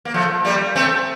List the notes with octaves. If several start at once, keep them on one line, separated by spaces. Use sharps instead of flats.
A#3
F3 A3
G3 A#3
A3 C4